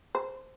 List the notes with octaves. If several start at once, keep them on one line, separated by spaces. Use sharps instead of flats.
C5